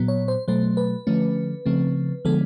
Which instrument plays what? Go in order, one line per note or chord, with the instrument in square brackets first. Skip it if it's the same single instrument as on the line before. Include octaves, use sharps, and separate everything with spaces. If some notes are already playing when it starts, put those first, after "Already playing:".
Already playing: [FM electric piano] A#2 F#3 B3
C#5
C5
B2 F#3 A3 C5
B4
D3 F3 A3 C#4
C#3 F3 A3 C4
D3 F3 G#3 B3 A4